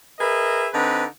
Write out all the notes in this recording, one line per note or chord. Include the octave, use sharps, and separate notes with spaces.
G#4 A#4 B4 D#5 E5
D3 C4 D#4 B4